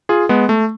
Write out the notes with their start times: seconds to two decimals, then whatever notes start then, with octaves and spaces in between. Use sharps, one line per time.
0.09 F4 G#4
0.29 G#3 B3
0.49 A3